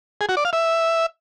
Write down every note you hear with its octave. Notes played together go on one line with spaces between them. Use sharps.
G#4
F#4
D5
F5
E5